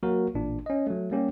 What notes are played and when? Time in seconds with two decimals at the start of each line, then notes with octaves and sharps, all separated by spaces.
0.03 F#3 A#3 F#4 A#4
0.34 A1 A#2 D4
0.66 C#4 D#5
0.87 F#3 A3
1.11 G3 A#3 C#4 G4